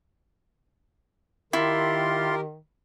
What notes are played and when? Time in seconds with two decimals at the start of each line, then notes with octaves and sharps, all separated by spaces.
1.53 D#3 E4 F4 G4 A#4 C6